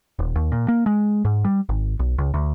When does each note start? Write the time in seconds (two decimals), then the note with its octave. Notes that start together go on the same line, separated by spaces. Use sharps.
0.19 D#1
0.36 D#2
0.52 A#2
0.68 A#3
0.86 G#3
1.25 G#2
1.45 G3
1.69 G#1
1.99 B1
2.18 C#2
2.34 D2